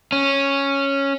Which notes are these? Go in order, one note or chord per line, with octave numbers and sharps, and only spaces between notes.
C#4